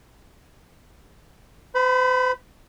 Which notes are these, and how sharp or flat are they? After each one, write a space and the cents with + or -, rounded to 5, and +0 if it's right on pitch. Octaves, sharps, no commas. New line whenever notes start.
C5 -45 B5 +0